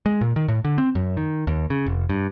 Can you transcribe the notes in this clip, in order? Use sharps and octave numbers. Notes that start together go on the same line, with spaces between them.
G#3
A#2
D#3
A2
D3
C4
F#2
D#3
D#2
C#3
F1
G2